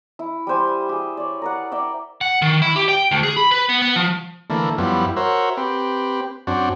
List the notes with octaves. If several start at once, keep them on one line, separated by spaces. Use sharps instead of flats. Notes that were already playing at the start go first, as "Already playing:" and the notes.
E4
G3 G4 C5 G#5
G4 G#4
C#5 D5
A#4 D5 F#5
D5 E5 G5
F#5
D#3
E4
G4
G5
D2
G#4
B5
B4
B3
B3
F3
D3 E3 A3 A#3
F#2 F3 G3 B3 E4
F#4 A#4 C5 C#5 E5
C4 G4 B4
F#2 C4 D4 F#4